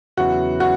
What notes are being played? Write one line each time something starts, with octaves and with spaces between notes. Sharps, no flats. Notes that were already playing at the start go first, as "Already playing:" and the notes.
E2 C#3 F#3 B3 E4 F#4
F#4